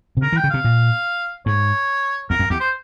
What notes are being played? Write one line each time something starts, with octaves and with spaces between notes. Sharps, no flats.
C3
C#3 A#4
E3
G5
C#3
C3 F5
A#2
G#2 C#5
E2 A#4
F2
E2 G4
C5